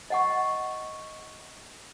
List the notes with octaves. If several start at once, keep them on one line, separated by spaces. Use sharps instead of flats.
D#5 F#5 C#6